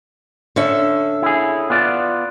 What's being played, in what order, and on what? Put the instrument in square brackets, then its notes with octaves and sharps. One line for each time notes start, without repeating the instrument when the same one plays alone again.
[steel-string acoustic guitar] D3 C#4 E5
[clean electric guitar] E4 G#4
B3 F4 D5